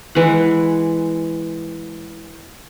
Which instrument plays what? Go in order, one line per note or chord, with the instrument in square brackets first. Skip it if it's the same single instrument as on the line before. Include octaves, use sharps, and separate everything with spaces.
[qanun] E3 G#3 F#5